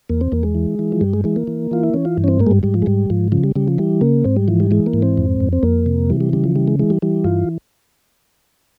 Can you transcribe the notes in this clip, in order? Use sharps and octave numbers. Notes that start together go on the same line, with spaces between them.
E2 A#3
C4
E2 A#3
G#3
E3
E3
F3
G2 G3
G#3
E3 G#3
A#3
E3
E3 F4
E4
E3 C#4
F4
G2
C#4
C4
G#2 A#3
G#3
G3
G#2 G3
F3
G#3
G#2 G3
G#2 F3
C#3 F3
G3
C#3 G3
F3
E3 G3
C#3 A#3
G#2 C4
G3
E3 F3
G3
E3 G#3
A#3
G#2
C4
F2
F2
C4
F2 A#3
C3
E3 G3
G3
C#3 G3
F3
E3 G3
G#3
E3 G#3
G3
E3 G3
G2 F4